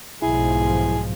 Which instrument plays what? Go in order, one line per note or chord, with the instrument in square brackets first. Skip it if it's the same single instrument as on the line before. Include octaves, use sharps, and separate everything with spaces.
[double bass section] B1 G#2 F3 [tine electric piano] E4 [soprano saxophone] G#4